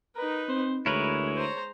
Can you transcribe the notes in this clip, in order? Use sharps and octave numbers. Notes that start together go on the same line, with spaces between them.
D#4 A#4 B4
C4 C5
D2 G#3 E4 A#4 B4 C#5
C5 A#5